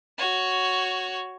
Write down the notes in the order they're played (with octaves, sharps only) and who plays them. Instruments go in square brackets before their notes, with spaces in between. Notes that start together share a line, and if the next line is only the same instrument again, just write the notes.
[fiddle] F#4 C#5